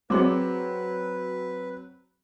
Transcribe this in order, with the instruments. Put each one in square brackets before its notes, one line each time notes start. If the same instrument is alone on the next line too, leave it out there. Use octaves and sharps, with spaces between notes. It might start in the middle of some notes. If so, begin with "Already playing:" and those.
[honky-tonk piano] F#3 C4 [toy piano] G#4 C6 D6 [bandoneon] B4